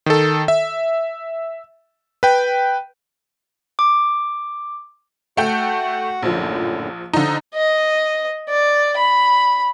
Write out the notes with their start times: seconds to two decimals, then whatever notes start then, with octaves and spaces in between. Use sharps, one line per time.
0.06 D#3 A4
0.48 E5
2.23 B4 G5
3.79 D6
5.37 A3 F#4 F#5 G5
6.22 A#1 F#2 A2 D3 F3
7.13 D3 F3 D#4
7.55 D#5
8.49 D5
8.97 B5